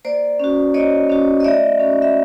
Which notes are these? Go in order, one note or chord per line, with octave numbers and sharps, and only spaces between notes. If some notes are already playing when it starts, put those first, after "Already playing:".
A#3 C5 D5
C#4 F#4
A#3 C#5 D#5
C#4 F#4
D#5
A3 D5 E5
C#4 F#4
E5